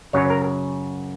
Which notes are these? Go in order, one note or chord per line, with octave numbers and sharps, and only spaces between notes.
F#2 C#3 F#3 C#5
A#4